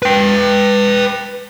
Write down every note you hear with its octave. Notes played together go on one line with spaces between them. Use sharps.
B4 G5